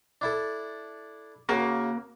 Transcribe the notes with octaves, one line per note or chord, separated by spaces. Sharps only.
D4 E4 A4
C#3 A#3 F#4